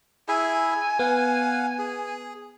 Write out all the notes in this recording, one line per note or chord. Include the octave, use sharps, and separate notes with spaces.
E4 G#4 E5 G#5
B3 F5 F#5
G#4